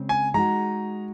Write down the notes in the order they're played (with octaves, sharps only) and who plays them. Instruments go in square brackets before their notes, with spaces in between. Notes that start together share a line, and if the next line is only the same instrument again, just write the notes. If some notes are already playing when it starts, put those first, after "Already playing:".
Already playing: [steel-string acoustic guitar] C#3 G#3 C4
[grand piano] G#5
[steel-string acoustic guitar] G#3 D#4 F#4 [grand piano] A#5